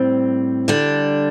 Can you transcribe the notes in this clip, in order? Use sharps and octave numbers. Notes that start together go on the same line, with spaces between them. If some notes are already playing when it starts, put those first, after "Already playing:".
Already playing: A2 G3 C4
D3 G3 D4